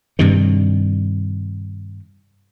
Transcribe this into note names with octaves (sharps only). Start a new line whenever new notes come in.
G2 C3 D#3